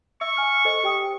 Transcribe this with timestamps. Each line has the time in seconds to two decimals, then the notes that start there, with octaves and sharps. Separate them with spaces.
0.21 E5 C#6 E6 C#7
0.37 G#5 F6
0.65 A4 C5 D#5
0.83 G4 G5 D#6